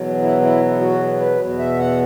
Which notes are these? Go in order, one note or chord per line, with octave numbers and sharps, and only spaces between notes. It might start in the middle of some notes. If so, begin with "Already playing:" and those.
Already playing: E2 B2 F#3 B3
E4
E4
F#4
B4
E2 B2 B3
E5
F#5